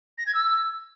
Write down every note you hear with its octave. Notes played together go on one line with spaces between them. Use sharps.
A#6
G#6
E6